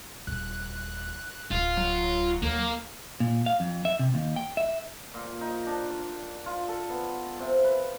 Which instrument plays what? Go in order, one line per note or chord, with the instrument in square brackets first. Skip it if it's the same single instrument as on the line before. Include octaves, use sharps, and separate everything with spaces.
[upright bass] D#1 [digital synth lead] F#6
[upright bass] D1 [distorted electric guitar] F4
[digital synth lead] F#3
[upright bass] D#2 [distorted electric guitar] A#3
[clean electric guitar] A#2
F5
F2
E5
C3
D#2
G5
E5
[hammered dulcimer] A#2
D#4
D4
D5
F4
A4
B3
C3
B4